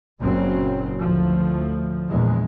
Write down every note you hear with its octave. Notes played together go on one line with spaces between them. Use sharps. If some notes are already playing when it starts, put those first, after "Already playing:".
F#1 A#2 C#3 F#3 C4
D2 A2 F3
A#1 E2 G#3